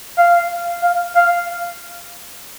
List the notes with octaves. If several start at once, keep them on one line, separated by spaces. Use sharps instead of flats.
F5
F5
F5